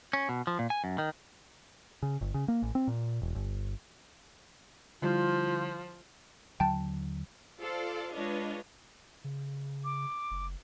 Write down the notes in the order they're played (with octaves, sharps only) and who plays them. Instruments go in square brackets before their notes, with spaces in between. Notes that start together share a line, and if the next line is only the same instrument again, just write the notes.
[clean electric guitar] C#4
B2
F3
A#2
G#5
F#2
D#3
[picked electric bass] C#3
G1
C#3
A#3
A1
C4
A#2
E1
G1
[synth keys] D3 G3 E4 [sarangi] F3 [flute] F4
[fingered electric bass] D#2 D3 F#3 [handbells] G5 A5
[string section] F4 A4 C5 D5 F5
G#3 D4 F4 B4 C#5 D#5
[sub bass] C#3
[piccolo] D6
[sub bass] F#1